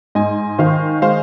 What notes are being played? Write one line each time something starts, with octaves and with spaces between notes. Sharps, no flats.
G#2 D#5 G#5
D#3 C5 F5
G#3 C5 F5